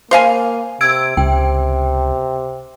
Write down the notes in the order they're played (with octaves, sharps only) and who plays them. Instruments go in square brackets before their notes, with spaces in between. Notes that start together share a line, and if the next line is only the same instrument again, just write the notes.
[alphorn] A#3 [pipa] C5 F5 G#5
[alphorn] C3 [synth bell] E6 G#6 D7
[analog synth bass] C#2 [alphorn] C3 [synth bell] G5